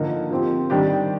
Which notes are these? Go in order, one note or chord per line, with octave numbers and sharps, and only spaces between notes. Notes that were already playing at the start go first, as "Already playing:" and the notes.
Already playing: D3 F3 A#3 D#4
F3 C4 G4
D#3 G3 D4 G4